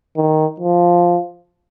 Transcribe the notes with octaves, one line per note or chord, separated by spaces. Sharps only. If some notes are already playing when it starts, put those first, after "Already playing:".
D#3
F3